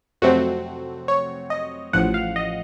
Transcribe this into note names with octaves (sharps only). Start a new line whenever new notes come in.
F2 C3 F#3 A3 C4 F#4
C#5
D#5
A1 A2 F3 F#5
F5
D#5